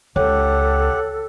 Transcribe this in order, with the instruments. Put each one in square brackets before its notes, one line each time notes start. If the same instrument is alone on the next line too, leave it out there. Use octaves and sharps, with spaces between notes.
[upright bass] C#2 [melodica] G4 F#5 [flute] A4 [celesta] C#5